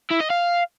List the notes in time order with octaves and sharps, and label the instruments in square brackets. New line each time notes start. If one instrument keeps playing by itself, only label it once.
[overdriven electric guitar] E4
D#5
F5